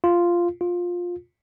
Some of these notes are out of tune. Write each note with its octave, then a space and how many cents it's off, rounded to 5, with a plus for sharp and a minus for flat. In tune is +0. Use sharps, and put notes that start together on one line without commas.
F4 -5
F4 +15